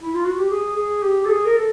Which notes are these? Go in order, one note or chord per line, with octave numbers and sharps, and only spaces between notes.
E4
F4
F#4
G4
G#4
G#4
G4
A4
G#4
A#4
A4